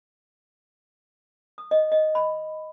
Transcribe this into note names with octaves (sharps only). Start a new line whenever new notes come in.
D#6
D#5
D#5
B5